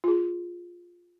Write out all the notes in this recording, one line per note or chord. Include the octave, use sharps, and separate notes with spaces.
F4 G#4